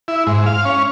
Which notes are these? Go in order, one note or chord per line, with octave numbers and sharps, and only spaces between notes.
E4
G#2
F5
C#4